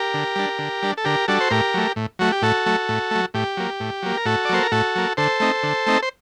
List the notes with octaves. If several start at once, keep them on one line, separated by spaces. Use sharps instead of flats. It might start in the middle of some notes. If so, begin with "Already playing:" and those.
Already playing: G4 A#4
D3
G3 D4
D3
G3 D4
A4
D3 G4 A#4
G3 D4 F#4 A4
C5
A2 G4 A#4
F#3 A3
A2
F#3 A3 F#4
G4
A2 F#4 A4
F#3 A3
A2
F#3 A3
A2 G4
F#3 A#3
A2
F#3 A#3
A#4
A2 F#4 A4
D5
F#3 A#3 C5
A#4
A2 F#4 A4
F#3 A#3
D3 A4 C5
A3 C4 D#4
D3
A3 C4 D#4
C5